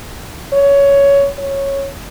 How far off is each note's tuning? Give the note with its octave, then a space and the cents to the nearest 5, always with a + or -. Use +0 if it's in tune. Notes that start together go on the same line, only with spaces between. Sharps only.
C#5 +15
C#5 -10